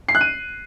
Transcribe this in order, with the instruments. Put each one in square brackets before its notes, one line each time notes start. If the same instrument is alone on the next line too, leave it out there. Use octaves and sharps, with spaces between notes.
[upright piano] C7
F#6
D#7